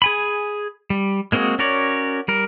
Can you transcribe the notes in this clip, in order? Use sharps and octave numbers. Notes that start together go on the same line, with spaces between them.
G#4 G#5 B5
G3
G#3 A#3 C4 F#4 G#4
C#4 F#4 A#4 C#5 D5
G3 A#4